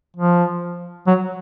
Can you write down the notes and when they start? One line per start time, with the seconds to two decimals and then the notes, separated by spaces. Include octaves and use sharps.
0.17 F3
1.07 F#3